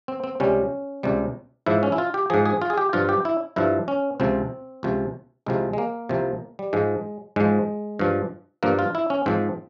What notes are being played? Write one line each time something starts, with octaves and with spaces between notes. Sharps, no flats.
C4
C4
C#2 C3 G3 C#4
C#2 C3 G3
G#2 F3 E4
C#4
E4
F4
G4
G#2 F3 G#4
G#4
F4
G#4
G4
G2 F3 F4
G4
E4
G2 F3 E4
C#4
C#2 C3 F3 C4
C#2 C3 F3
C2 C3 F3 G#3
G#3
A#3
C2 C3 F3
G3
G#2 F3 G#3
G#2 F3 G#3
G2 F3
G2 F3 A#3
F4
E4
C#4
G#2 F3 C4